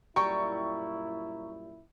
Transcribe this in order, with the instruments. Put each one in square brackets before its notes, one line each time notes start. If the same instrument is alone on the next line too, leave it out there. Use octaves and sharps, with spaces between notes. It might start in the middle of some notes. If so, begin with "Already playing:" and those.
[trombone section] F#2 A#2 E4 [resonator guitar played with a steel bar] G3 G5 [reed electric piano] A#5 [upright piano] C#6